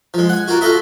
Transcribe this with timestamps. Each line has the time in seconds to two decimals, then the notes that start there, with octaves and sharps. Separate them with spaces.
0.14 F3 G#3
0.29 F#5 G#5
0.48 A#3 F4 F#4
0.61 F4 F#4 A4 D#5 E5